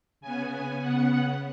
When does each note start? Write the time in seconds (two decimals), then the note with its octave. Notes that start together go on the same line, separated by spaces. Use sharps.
0.21 C#3 B3 G#5
0.50 G#5
0.79 C#3 B3 F#5